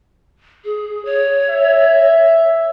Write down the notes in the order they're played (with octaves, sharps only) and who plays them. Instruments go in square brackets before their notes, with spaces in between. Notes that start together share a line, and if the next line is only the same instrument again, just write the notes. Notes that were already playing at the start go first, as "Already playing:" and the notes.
[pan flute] G#4
C#5
[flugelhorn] E5